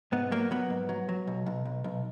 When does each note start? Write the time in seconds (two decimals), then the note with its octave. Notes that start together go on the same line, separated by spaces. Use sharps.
0.12 G#2 B3
0.31 F#3 A#3
0.51 F#3 B3
0.70 G#2
0.89 F#3
1.09 F#3
1.27 B1
1.46 B1
1.66 B1
1.84 B1